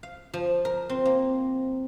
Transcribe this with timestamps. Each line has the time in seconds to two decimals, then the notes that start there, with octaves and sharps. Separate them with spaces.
0.03 F5
0.33 F3
0.65 A#4
0.89 C4
1.05 A#3